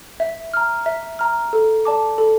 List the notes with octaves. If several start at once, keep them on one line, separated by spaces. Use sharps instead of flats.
E5
A#5 F6
E5
A#5 F6
A4
D5 A5 D6
A4